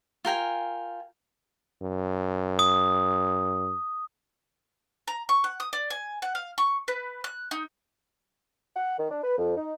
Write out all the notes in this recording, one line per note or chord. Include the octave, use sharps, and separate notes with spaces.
F4 A#4 G5 G#5
F#2
D#6
A#5
C#6
F#5
D#6
D5
G#5
F#5
F5
C#6
B4
F#6
D#4
F#5
D#3
D4
B4
F2
D#4